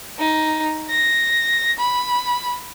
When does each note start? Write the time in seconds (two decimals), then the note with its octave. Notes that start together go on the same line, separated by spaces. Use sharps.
0.19 D#4
0.90 A#6
1.79 B5